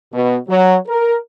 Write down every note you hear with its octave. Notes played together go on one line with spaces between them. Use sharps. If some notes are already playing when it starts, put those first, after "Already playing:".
B2
F#3
A#4